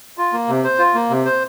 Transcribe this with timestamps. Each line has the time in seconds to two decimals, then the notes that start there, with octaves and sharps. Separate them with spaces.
0.18 F4
0.33 A#3
0.49 C3
0.64 C5
0.78 F4
0.95 A#3
1.10 C3
1.25 C5